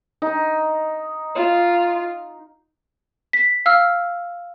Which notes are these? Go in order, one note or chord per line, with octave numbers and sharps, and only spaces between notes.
D#4
F4
B6
F5 E6 F6